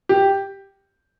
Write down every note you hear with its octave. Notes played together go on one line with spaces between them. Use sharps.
G4